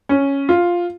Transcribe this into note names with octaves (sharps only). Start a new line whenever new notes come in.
C#4
F4